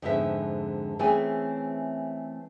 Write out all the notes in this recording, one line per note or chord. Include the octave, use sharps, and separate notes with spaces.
F2 G#2 D3 G#3 B3 E5
E3 A3 C4 C#4 G#4 G#5